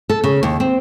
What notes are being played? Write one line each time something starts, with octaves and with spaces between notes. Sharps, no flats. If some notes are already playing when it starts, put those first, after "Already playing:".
A4
C#3
D#2
C4